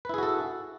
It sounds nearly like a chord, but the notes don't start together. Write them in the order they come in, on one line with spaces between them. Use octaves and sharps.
B4 E4 G#4 F#4 A4